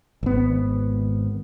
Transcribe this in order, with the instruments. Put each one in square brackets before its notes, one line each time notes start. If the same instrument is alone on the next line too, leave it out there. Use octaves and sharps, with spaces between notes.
[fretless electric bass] G#1 B3